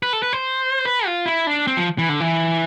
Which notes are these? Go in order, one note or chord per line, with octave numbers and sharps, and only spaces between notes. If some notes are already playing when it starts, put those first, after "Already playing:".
B4
A4
B4
C5
B4
F4
E4
D4
C4
F3
E3
D3
E3